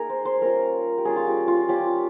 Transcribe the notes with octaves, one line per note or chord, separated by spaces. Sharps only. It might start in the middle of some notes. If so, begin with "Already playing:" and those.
Already playing: A#3 D#4 G#4 A#4
C5
C5
G3 C#4 F4 A#4
G4
G3 C#4 F4 G#4
F4
G4
F4
G3 C#4 F4 G4